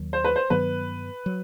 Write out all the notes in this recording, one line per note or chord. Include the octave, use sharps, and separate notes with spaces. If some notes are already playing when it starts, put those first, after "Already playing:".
Already playing: D#2 D#3 F#3
C5
B4
C5
G2 D#3 F#3 B3 B4
F#3